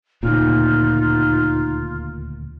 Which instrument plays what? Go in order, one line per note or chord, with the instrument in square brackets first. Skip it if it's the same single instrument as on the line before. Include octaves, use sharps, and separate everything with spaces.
[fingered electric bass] D#1 D2 C#3 [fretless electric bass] A#2 [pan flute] D#4 [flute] F4